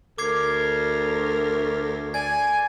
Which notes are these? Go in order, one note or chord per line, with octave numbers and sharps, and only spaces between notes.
D2 A#4 D6 G#6 C7
D5 G#5 G#6